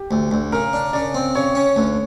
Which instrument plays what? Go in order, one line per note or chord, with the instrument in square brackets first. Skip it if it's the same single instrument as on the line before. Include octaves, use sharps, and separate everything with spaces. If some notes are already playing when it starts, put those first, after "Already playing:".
Already playing: [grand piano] G4
[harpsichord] D2
D2
[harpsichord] C#3 [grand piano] A#4
[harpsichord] D4
[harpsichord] C#3 [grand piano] D5
[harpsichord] C4
[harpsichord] C#3 [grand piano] C#5
[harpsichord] C#4
D2